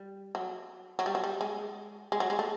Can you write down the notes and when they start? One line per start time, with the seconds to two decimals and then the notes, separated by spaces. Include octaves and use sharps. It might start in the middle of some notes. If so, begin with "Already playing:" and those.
Already playing: G3
0.35 F#3
0.99 F#3
1.06 G3
1.15 F#3
1.24 G3
1.41 G#3
2.12 G#3
2.20 F#3
2.30 G#3
2.39 A3